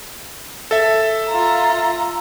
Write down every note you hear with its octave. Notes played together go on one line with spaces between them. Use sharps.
A4 E5
F4 A#5